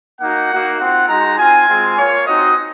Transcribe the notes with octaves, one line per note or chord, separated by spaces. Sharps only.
A#3 D#4 F#4 F#5
A#3 D#4 F#4
C4 F4 F#5
G#3 D#4 F#4 A#5
C4 F4 G#5
G#3 C4 F4
A#3 F4 C#5
C4 D#4 F#4 D#5